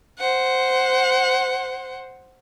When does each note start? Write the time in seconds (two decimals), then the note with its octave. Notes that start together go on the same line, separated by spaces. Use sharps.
0.18 C5 F#5